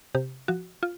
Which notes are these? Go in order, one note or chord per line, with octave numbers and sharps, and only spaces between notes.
C3 G4
F3 F#4
F4